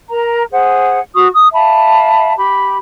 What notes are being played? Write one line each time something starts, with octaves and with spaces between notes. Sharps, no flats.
A#4 A#5
G#4 C5 F#5
F#4 C#6 D#6
D#6
E5 F5 A5 B5
G4 B5